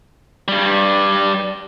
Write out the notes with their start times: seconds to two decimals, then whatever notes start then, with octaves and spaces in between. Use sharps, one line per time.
0.48 G2 G3